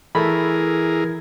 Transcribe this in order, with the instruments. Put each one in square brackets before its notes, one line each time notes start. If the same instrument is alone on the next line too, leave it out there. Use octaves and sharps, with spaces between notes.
[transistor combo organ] E3 G#4 A#4 [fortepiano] A3 B5